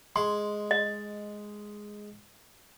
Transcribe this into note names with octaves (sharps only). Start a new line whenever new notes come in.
G#3 C6
D#5